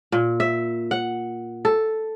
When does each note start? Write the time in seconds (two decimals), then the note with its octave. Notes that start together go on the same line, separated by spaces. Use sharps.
0.12 A#2
0.40 E5
0.91 F#5
1.65 A4